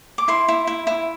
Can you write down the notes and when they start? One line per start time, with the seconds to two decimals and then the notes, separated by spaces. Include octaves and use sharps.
0.18 D6
0.28 E4 C6
0.48 E4
0.67 E4
0.87 E4